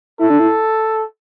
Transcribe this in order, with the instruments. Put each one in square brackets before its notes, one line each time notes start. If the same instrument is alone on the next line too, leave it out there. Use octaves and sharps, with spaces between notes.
[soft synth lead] E4 [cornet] A4
[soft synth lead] D4
E4